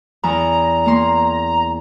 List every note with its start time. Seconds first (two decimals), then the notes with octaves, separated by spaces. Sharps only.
0.24 E2 A#5
0.86 A#3 C6